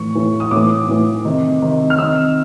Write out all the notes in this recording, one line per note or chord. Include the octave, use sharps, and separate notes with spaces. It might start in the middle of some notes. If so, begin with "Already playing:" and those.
Already playing: A2 E3 C#6
A2 E3
D#6
A2 E3 D6
A2 E3
C3 D#3
C3 D#3
F6
C3 D#3 E6